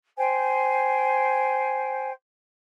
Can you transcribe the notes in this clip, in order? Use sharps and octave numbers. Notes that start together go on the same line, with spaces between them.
C5 G5 G#5